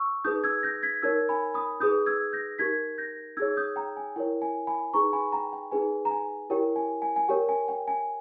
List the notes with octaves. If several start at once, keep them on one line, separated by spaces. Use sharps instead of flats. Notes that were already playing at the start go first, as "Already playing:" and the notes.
Already playing: C#6 E6
D#4 G#4 B4 D#6 G6
E6 G#6
G6 A#6
G#6 B6
D#4 A#4 C#5 E6 G#6
G#5 B5
B5 D#6
D#4 G#4 B4 D#6 G6
E6 G#6
G6 A#6
D#4 G4 A#4 G#6 B6
G6 A#6
D#4 G#4 C#5 E6 G#6
D#6 G6
G5 A#5
G#5
E4 A#4 C#5 G5
G#5
G#5 B5
D#4 G#4 B4 A#5 C#6
G#5 B5
G5 A#5
G5
D#4 G#4 B4 G#5
A#5
G#5
E4 G4 A#4 C#5 G5
G#5
G#5
G#5
G4 A#4 C#5 G5
G#5
G5
G#5